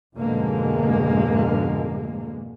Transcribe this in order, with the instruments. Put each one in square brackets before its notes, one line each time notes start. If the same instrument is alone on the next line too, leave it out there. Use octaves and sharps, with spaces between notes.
[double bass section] F2 G#2 B2 D3 G#3 A#3